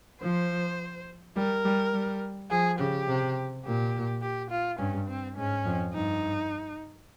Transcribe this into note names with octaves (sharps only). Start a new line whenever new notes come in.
F3 C5
G3 A#4
G3
G3
F3 G#4
C#3 G4
C3
A#2 G4
G4
F4
G2 C#4
C4
G#2 C#4
F2
G2 D#4